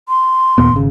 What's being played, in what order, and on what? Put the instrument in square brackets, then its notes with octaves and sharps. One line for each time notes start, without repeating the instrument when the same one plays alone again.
[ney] C6
[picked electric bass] D#2 A#2 B3
G#1 C#3